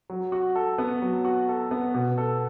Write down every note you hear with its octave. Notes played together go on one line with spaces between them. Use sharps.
F#3
F#4
A4
B3
F#3
F#4
A4
B3
B2
A4